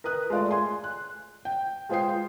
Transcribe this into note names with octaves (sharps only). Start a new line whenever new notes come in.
A#4 B4 D#6 F#6
G#3 A3 F4 D5
G#5 C6
F#6
G5
G#3 F4 G#4 C5 G5 C7